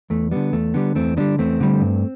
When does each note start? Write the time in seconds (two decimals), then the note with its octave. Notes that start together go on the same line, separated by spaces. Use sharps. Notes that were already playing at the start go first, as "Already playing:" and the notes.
0.10 E2 A3
0.31 D3 G3 B3
0.53 E2 A3
0.74 D3 G3 B3
0.95 E2 A3 C4
1.17 D3 G3 B3 D4
1.38 E2 A3 C4
1.60 D3 G3
1.81 G2